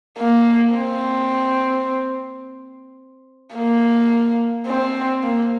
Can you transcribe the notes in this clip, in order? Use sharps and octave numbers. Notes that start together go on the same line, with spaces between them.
A#3
C4
A#3
C4
A#3